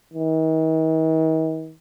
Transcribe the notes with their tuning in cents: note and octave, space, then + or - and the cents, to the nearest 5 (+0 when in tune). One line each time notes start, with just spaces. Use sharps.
D#3 +45